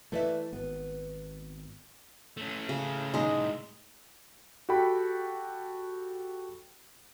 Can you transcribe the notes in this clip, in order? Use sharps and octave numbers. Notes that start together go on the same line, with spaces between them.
E3 A3 B4 D5 E5
G#1 B3
A3 C#4
C#3
C2 A2 G#3 D#4
F#4 G4 A4 G5 B5